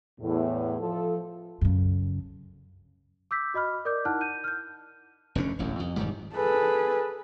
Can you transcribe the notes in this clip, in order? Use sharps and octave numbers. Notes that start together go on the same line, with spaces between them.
E2 A2
F3 A4
F#2 C#3
D6 E6 G6 B6
F#4 D#5 B5 F6
A#4 D5 D6 G6
D#4 E4 F#5 A5 F6 F#6
G6 D#7
F6 G6
F1 F#2 D3 C#4
E1 A1 F#2
F2
E1 G#2 D#3 G3
G#4 A4 B4